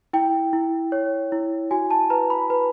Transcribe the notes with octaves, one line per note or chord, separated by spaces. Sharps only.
E4 G5
E4
C#5
E4
F#4 G#5
A5
B4 A#5
B5
B4